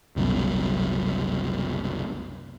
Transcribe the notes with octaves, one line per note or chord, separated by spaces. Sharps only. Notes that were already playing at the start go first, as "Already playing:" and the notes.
F#1 C2 F#2 B2